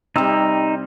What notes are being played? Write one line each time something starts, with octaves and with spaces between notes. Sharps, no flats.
C3 G3 D#4 E6